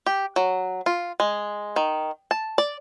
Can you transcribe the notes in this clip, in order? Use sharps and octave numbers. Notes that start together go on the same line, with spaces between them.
G4
F#3
F4
G#3
D#3
A5
D5